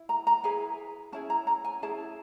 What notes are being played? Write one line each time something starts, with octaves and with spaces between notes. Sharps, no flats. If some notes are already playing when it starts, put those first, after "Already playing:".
Already playing: E4
A#5
A#5
E4 G#4 B4 G#5
C#4 E4 G#4 A5
A#5
A#5
G#5
C#4 E4 G#4 A5